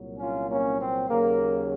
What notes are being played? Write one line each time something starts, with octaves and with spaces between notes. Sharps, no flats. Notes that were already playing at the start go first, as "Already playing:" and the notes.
Already playing: C2 A#2 F#3
C#4 F4
A#3 C#4
C4
D#2 C#3 F#3 A#3